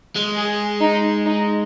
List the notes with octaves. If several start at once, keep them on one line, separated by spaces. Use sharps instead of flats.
G#3
G#4
D#4
D#4